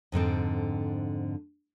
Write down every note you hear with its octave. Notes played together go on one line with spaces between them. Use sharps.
F2 G#2 D3 C4